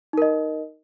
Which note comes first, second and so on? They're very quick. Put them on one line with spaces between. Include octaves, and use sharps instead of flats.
D#4 A#4 D#5